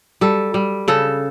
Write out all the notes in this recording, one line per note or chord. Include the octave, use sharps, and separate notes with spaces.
G3 A4
G3
C#3 A4